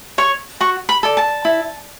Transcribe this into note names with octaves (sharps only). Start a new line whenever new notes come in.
C#5 C#6
F#4 C#6
B5
A4 D5
A5
E4